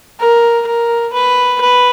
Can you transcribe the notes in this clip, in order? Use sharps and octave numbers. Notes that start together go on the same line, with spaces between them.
A#4
A#4
B4
B4